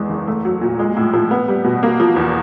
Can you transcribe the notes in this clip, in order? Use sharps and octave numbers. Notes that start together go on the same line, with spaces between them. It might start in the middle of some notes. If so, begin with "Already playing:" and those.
Already playing: E2 G#3
F#1
A3
F#3
A#2
G#3
A2
F3
B3
G3
B2
A#3
F3
E2